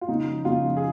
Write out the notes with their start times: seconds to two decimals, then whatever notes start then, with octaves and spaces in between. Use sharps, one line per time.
0.01 F4
0.08 C#3 D#4
0.26 F3
0.45 C#3 F4
0.64 F3
0.77 G#4